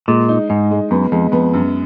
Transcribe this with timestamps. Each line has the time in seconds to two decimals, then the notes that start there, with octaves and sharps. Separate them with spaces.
0.08 A#2 G#3
0.29 D#4
0.49 G#2 D#4
0.71 G#3
0.91 F#2 B3
1.12 F2 G#3
1.32 F2 B3
1.54 F#2